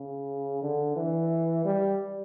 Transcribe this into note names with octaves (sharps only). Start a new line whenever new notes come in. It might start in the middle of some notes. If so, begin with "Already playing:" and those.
Already playing: C#3
D3
E3
G3